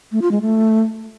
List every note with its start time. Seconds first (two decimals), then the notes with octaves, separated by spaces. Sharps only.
0.12 A3
0.22 F4
0.32 G#3
0.41 A3